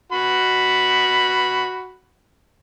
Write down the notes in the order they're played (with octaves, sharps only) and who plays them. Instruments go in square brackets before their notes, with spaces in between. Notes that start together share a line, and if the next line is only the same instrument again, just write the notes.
[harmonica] F#4 B5